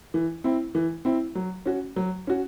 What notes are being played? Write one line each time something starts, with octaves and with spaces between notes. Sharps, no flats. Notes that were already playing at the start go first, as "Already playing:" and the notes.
E3
C4 E4
E3
C4 E4
F#3
C#4 F#4
F#3
C#4 F#4